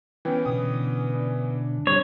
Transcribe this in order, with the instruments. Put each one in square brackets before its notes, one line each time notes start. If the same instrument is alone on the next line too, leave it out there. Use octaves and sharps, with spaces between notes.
[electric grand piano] E3 B3 C#4 [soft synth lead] G5
[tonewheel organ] B2 D3 [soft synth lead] D#6
[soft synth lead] D4
[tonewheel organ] G3 C4 [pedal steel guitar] C#5